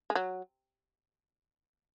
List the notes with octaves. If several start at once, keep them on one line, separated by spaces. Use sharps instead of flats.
G#3
F#3